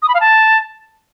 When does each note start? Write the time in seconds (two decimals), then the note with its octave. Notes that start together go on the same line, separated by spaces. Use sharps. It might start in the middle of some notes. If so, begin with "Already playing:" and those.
0.02 D#6
0.08 B5
0.14 F5
0.21 A5